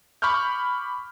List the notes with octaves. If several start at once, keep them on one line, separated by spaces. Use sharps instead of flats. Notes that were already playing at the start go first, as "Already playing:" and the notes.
B5 C#6 D6 F6 G6